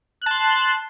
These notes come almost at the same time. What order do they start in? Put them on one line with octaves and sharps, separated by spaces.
F#6 A5 C6